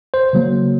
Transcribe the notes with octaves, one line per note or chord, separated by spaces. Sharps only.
C5
C#3 F#3 A#3